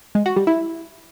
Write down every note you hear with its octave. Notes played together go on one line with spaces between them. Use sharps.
G#3
F#4
G3
E4